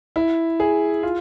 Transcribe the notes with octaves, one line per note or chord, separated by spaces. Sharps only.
E4
G#4
F4